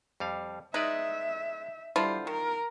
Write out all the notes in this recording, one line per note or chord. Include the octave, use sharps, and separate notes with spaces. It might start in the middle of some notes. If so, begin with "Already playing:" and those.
F2 G3 F5
G#3 D#4 B4 D5 E5
D3 G3 E4 F4 C5
D#3 A#4